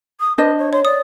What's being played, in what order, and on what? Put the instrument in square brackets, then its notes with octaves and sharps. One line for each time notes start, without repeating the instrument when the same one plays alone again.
[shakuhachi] D#6
[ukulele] D4 C5 D#5 [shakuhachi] B4
[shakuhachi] C#5
[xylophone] C#5 [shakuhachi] C6
[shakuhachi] D5 [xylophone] D#6